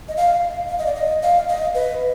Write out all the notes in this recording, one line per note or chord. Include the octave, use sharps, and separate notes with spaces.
D#5
F5
F5
D#5
D5
D#5
F5
D#5
B4